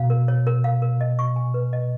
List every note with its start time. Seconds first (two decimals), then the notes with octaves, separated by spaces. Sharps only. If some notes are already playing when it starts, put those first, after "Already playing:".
Already playing: B2 F5
0.10 A#4
0.28 C#5
0.47 A#4
0.64 F5
0.82 A#4
1.01 D#5
1.19 C#6
1.36 G#5
1.54 B4
1.73 D#5